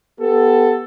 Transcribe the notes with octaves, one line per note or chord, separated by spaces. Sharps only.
B3 G4 A4